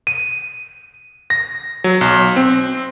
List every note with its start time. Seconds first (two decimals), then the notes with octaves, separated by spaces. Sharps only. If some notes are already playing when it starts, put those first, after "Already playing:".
0.07 D#7
1.30 A#6
1.84 F#3
2.01 B1
2.36 C4